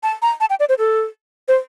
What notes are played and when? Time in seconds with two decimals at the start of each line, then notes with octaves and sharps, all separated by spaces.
0.03 A5
0.22 A#5
0.40 A5
0.50 G5
0.60 D5
0.69 C5
0.79 A4
1.48 C5